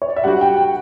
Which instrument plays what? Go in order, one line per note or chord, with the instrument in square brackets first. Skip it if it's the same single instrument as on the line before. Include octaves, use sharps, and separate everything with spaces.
[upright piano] C#5
D5
E5
[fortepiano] G3 D4 F#4 [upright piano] F#5
[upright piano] G5
G5